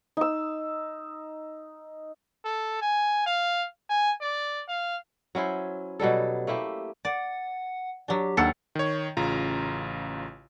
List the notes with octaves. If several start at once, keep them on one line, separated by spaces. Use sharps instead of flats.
D#4 E6
A4
G#5
F5
G#5
D5
F5
F#3 C#4 E4 C5
B2 F#3 G3 A4
A3 A#3 E4 G4
D5 F#5
F#3 D4 G4
D#2 D4 A4 F#5 C#7
D#3 C#5
A1 C#3 F4 A#5